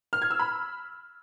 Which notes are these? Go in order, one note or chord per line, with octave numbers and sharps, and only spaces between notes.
F6
G#6
E6
B5